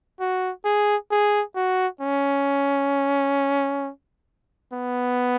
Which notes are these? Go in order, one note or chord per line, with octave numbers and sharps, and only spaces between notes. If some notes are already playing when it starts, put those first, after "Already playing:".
F#4
G#4
G#4
F#4
C#4
B3